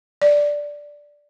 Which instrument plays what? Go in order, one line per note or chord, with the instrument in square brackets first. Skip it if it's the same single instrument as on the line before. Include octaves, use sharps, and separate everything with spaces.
[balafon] D5